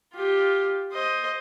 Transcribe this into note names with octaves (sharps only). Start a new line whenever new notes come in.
F4 G4
C5 D#5